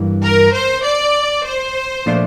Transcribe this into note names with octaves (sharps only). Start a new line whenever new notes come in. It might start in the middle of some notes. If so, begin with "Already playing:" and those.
Already playing: G2 E3 A#3
A#4
C5
D5
C5
A#2 F3 A3 D4 F4